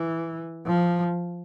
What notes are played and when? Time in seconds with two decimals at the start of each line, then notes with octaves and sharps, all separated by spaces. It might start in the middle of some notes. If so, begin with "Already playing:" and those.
Already playing: E3
0.67 F3